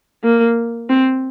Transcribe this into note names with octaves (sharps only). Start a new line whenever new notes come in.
A#3
C4